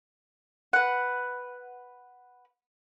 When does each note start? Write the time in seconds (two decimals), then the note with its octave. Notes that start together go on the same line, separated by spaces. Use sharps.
0.73 B4 F#5